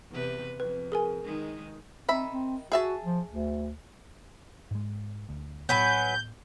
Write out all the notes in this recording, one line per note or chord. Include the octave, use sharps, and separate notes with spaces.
E2 C3 B4
F2 B4
G#4 A#4 G#5
D#3 G#3 D#4
D#3 C4 E5 B5
C4
F#4 G#4 E5 A5
F3
D2
G#2 G#3
D2
A2 F#3 B3 B4 G#5 G6